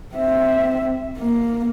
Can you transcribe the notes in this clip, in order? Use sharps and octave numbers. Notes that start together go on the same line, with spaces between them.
C4 E5
A#3